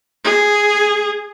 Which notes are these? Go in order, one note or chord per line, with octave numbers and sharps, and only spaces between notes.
G#4